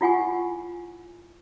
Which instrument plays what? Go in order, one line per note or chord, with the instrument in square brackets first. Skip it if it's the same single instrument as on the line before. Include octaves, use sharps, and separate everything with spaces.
[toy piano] E4 F4 F#5 G#5 C#6